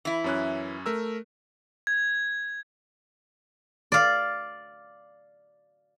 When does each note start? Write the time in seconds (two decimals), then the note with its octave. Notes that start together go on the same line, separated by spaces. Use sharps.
0.05 E3 E4
0.24 F#2 C#4 F#6
0.86 A3 A#4 E6
1.87 G#6
3.92 D5 F5